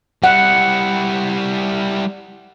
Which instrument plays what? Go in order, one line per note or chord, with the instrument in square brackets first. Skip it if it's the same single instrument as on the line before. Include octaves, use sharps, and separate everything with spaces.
[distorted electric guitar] G3 E4 [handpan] F#5